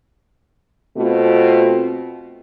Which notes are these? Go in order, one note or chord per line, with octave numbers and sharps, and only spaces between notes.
B2 A3 C4 F4